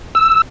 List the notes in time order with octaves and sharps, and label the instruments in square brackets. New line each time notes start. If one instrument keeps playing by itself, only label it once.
[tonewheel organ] E6